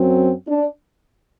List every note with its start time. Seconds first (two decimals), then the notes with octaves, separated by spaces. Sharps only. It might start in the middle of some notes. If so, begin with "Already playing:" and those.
Already playing: F#2 F#3 C4
0.47 D4